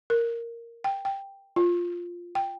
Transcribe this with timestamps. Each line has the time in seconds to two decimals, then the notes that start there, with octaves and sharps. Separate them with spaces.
0.10 A#4
0.84 G5
1.05 G5
1.56 F4
2.35 G5